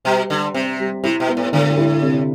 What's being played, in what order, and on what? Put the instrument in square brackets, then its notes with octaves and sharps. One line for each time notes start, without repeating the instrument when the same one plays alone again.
[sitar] B2 [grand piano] G3
[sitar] D3 [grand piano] G3
[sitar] C3 [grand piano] C4
[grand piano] G3
[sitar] C3 [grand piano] E4
[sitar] B2
[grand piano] B3
[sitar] A2
[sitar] A2 [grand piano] D3
[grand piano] E4
C3